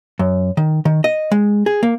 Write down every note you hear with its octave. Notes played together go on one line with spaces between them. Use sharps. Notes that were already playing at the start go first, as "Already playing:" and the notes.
F#2
D#3
D#3
D#5
G#3
G#4
A#3